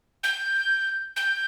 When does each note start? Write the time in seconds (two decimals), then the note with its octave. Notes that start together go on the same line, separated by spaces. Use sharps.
0.24 G6
1.16 G6